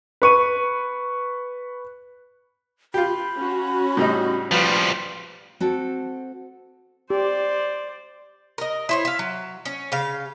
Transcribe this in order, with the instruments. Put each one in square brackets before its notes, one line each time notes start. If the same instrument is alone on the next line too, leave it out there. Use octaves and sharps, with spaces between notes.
[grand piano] B4 C#6 D#7
[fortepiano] F4 G4 [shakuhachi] B5
[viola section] C#4 F#4
[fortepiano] A2 G3 D#4
[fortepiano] A#1 [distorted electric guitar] F3 G3 [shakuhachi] B4
[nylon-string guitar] C4 F#4 A4
[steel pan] G4 [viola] C5 D5
[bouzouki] A#4 D#5
E4 C5 C#5
E5 F5
F#3
C#4
C#3 F5